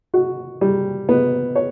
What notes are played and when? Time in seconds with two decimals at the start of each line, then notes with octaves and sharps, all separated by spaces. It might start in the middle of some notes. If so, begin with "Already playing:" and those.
0.14 F#4
0.61 G3
1.09 B3
1.56 C#5